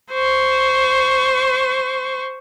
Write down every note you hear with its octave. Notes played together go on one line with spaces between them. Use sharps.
C5 C#6